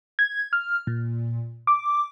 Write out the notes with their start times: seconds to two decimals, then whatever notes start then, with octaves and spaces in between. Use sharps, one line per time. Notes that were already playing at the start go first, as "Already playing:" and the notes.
0.19 G#6
0.53 F6
0.87 A#2
1.67 D6